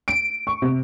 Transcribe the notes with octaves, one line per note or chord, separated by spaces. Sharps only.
D7
C#6
C3